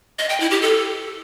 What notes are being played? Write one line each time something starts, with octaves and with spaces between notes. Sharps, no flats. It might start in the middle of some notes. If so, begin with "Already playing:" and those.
D#5
G5
E4
G4
A4